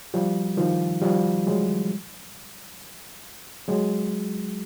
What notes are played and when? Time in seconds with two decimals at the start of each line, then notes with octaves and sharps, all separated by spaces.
0.14 F3 G3
0.57 D#3 F3
1.02 F3 G3
1.47 F#3 G#3
3.68 F#3 G#3